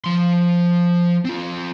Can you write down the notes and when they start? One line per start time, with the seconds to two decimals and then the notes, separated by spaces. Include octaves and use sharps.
0.04 F3 C6
1.25 C4 F4